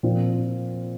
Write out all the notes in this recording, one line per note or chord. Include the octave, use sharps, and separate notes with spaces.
A#2 F3 C4 F4